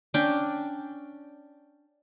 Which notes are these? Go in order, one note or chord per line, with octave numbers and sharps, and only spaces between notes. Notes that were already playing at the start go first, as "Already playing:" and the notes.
C#4 D4 G5